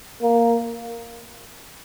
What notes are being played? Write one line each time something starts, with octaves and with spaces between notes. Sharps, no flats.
A#3